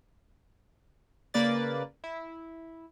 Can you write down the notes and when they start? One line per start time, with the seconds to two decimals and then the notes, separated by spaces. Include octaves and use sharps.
1.34 C#3 A#3 B4 D5 A6
2.04 E4